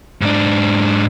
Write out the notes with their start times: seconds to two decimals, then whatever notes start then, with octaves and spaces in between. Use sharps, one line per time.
0.21 G#2 D4